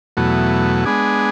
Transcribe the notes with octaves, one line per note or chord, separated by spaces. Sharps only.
E2 B2 F#3 A3
G#3 B3 D4 G#4